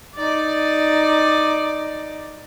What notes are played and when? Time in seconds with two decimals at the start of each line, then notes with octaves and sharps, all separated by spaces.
0.16 D#4 D5